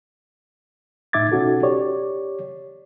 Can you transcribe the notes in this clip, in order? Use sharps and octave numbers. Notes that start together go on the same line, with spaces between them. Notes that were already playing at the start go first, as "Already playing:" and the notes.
A2 D#4 E5 D6 G#6 A6
B2 C#4 D#4 F#4 A4
G4 C#5 D5